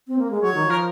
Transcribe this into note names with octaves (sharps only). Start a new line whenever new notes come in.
C4
A#3
G#3
F#3 C#5
D#3
F3 A#4